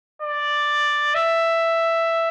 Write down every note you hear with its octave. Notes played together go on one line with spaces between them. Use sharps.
D5
E5